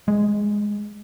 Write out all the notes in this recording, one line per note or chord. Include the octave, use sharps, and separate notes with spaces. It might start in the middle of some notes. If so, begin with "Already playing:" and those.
G#3